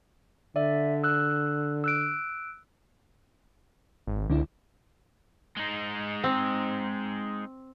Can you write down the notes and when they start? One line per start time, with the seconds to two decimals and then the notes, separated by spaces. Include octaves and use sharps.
0.56 D3 D5 E5
1.04 E6 F#6
1.84 E6 F#6 D7
4.07 G#1
4.29 C#2 D3 D4 E4
5.57 G#3 D#4
6.24 C4